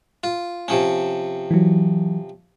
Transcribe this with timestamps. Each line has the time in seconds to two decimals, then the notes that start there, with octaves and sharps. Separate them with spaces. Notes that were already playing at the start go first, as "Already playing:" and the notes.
0.24 F4
0.68 C3 F3 C#4
1.51 E3 F#3